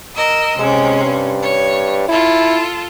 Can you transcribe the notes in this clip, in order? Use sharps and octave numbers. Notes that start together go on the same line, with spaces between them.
A#4 D#5 E6
C3 G#3 C#4
G2
C#5
E4 F4 A4